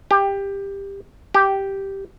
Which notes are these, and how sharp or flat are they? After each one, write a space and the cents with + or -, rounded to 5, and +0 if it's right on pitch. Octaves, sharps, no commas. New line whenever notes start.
G4 +15
G4 -5